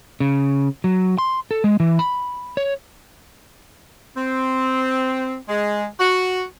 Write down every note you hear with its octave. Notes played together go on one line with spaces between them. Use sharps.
C#3
F#3
C6
A4
G#3
E3
B5
C#5
C4
G#3
F#4